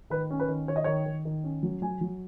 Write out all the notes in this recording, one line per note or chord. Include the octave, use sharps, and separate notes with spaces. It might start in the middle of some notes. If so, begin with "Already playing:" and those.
D#3 B4
C#4
B4
D#3
D#3 C#5
D#5
D#3 C#5
D#3
D#3
C#4
F#3
F#3 G#5
F#3